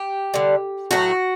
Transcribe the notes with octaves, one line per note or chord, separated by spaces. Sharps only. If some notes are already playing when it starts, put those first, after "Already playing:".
Already playing: G4
D3 G3
A2 F#3 A3 F#4